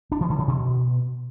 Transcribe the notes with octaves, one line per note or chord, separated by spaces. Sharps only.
D4
E3
D3
C#3
B2